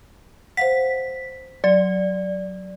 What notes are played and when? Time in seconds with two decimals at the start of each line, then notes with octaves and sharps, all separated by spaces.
0.57 C5 F5 F#5 B6
1.64 F#3 D5